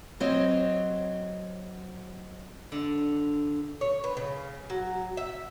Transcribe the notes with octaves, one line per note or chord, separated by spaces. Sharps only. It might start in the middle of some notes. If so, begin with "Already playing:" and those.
F#3 C4 C#5 D#5
D3
C#5
B4
C#3
F#3
E5